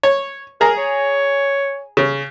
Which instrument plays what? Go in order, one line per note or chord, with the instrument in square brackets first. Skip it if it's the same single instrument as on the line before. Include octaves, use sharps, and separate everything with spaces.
[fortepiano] C#5
[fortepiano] G#4 A#5 [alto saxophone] A#4
[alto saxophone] C#5
[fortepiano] C#3